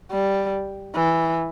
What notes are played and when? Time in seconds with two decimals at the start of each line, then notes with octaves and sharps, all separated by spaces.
0.11 G3
0.95 E3